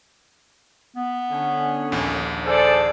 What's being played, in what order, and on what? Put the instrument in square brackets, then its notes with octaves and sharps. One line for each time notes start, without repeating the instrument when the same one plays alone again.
[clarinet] B3
[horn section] D3 C#4
[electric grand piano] A#1 D#2
[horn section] G#4 A4 [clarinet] C5 [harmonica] D5